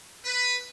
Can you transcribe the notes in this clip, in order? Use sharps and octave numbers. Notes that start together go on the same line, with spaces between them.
B4